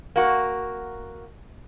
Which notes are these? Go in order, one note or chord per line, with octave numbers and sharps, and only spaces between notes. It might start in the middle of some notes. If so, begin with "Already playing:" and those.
A#3 F#4